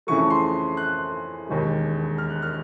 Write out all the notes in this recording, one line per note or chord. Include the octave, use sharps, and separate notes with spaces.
F2 C#3 E3 A3 C#6
C6
F#6
E1 D#2 D#3 G#3
F6
F#6
F6